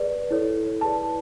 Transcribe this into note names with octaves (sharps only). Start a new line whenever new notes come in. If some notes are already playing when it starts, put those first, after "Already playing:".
Already playing: G#4 B4 D5
E4 A4 C#5
E4 G#4 B4 D5 A5